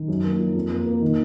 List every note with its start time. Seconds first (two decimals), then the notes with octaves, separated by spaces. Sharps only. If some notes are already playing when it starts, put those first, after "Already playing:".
Already playing: D#3
0.08 F#2
0.24 A#3
0.39 F3
0.55 F2
0.70 A#3
0.86 A#3
1.02 D#3